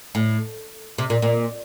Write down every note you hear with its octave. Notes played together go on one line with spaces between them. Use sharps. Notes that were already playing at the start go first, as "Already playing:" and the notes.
A2
C3
A#2
A#2